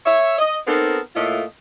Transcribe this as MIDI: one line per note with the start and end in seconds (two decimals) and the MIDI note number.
0.05 0.38 73
0.05 0.38 76
0.39 0.56 75
0.66 0.98 59
0.66 0.98 60
0.66 0.98 63
0.66 0.98 69
0.66 0.98 70
1.15 1.42 45
1.15 1.42 57
1.15 1.42 58
1.15 1.42 65
1.15 1.42 75